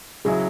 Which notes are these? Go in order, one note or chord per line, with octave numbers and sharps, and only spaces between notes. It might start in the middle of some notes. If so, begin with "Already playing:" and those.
C#3 F#3 E4 G#4